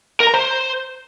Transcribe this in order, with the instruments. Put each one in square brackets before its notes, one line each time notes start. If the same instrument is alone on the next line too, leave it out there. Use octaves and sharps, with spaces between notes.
[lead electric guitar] A#4
A#5
C5